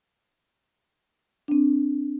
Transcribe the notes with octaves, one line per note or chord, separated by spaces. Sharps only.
C4 D4